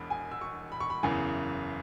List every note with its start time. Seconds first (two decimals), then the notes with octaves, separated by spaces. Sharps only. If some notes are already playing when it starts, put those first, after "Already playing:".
Already playing: E1 E2 B2 B5
0.10 G#5
0.31 E6
0.41 C#6
0.72 B5
0.80 C#6
0.90 B5
1.03 F#1 E2 C#3 E3 G#5